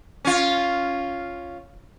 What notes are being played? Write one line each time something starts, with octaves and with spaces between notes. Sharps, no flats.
C#4 F4